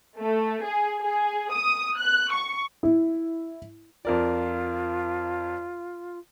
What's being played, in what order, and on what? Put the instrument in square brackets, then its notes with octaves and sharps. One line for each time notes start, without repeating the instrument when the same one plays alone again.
[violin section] A3
G#4
G#4
D#6
F#6
C#6
[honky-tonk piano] E4
[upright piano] F2 A#4 D5 [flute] F4